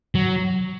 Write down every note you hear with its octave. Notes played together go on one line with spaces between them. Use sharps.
F#3